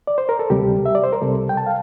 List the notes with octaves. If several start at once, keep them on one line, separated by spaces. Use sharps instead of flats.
D5
C5
A#4
A4
D2 C3 G3 G4
E5
D5
C5
A#4
C2 C3 G3 A4
G5
A5
F5